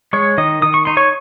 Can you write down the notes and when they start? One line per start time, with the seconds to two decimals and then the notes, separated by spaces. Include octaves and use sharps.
0.13 G#3 C#5 C#6
0.38 D#3 D#5 D#6
0.62 D#3 D#6
0.74 C#6
0.85 D#4 C6
0.97 C#5 C#6